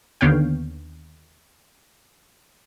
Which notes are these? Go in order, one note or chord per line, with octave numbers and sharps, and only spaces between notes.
D#2 D3 B3 C#5 F5 G5